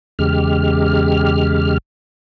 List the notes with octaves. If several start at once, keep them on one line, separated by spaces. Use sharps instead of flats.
E2 C#3 G#3 G4 F6